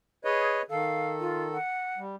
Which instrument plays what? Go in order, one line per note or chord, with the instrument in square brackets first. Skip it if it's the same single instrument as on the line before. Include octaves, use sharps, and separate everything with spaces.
[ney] G#4 [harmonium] B4 C#5 D#5
[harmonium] D#3 A4 [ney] F5
[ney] F4
F#5
[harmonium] G3